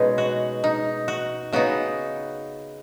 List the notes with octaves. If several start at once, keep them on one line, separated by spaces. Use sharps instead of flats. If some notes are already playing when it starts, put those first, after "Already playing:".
Already playing: B2 G#3 C#4 D#4 G#4
F#4
D#4
F#4
C#3 B3 D#4 F#4